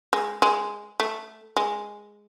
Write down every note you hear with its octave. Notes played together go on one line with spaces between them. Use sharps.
G#3
G#3
A3
G#3